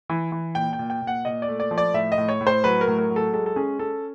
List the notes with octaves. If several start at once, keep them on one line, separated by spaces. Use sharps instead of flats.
E3
E3
A#2 G5
G5
A#2
G5
A#2
F#5
A#2 D#5
D5
A3
D5
F3
D5
A2 E5
D#5
A2
C#5
A2
C5
F#3 B4
A#4
A2
A#4
F#3
A4
G#3 A4
A4
C#4 G#4
C#4 A4